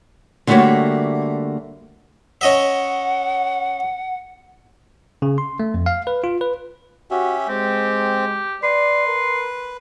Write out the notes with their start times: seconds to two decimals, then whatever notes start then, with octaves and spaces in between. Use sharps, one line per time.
0.47 D3 G3 A3 A#3 F#4 C#5
2.41 C#4 D#5 E5 F#5
5.22 C#3
5.38 C6
5.60 A3
5.74 F2
5.86 F5
6.07 B4
6.24 F4
6.41 B4
7.11 C#4 F#4 G4 E5
7.48 G#3 C4 G4
8.63 B4 D5 C6
9.07 A#4